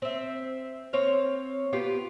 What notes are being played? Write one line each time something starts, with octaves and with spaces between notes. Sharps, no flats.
C4 E5
C4 C#5 F5
B3 F4 G4